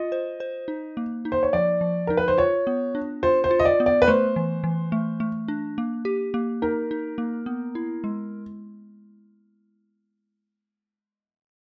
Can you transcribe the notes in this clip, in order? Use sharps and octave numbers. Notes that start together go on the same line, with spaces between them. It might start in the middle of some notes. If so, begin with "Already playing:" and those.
Already playing: F4 D#5
C5
C5
D#4
A#3
D#4
C5
C#5
F3 D5
F3
D#4 A#4
B4
C5
F4 C#5
B3
D4
F4 C5
C5
F4
D#5
D5
B3
D5
B4
A3 C5
E3
E3
A3
A3
D4
A#3
G4
A#3
D#4 A#4
D#4
A#3
B3
E4
G#3